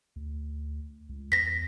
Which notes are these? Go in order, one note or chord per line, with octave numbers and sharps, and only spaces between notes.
D2
C#2
E2 A#6 B6